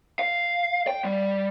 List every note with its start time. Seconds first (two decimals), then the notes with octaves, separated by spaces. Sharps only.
0.19 F5
0.87 G5
1.04 G3